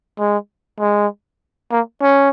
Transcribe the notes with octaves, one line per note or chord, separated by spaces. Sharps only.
G#3
G#3
A#3
C#4